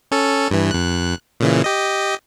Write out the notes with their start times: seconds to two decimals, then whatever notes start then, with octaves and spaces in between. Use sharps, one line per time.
0.11 C#4 A4
0.51 G2 E3
0.71 F2 F#6
1.40 A#2 C#3 E3
1.64 G4 D#5